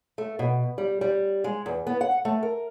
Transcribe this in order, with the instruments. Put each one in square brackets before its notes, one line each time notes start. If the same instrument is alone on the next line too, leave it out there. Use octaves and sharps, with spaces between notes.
[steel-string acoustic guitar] A3
B2
G3
G3
G#3
E2
B3
F#5
A3
A#4